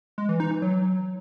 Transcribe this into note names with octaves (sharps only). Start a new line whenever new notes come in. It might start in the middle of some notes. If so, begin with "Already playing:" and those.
G#3
E3
D#4
E3
F#3